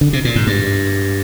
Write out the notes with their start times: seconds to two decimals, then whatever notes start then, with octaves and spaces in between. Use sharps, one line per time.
0.01 D3
0.13 C3
0.25 A#2
0.36 G#2
0.47 G2